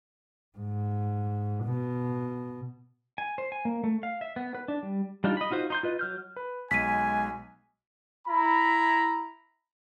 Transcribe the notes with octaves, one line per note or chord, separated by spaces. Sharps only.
G#2
B2
G#5
C5
G#5
A#3
A3
F5
E5
B3
B4
D4
G3
G3 D4 D#4 F4
D#5 B5
D#4 F4 F#4 C5
D#4 C6 G6
F4 B4 D#5
F#3 F6 G6
B4
B1 G#3 G#5 B6 D#7
E4 A#5 B5